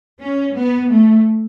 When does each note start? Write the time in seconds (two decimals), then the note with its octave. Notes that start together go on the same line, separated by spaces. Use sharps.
0.21 C#4
0.56 B3
0.91 A3